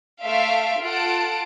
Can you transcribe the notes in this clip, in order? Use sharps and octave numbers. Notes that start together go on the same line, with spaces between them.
A3 A4 E5 F5 C6 D7
F4 A4 F#5 A5 D7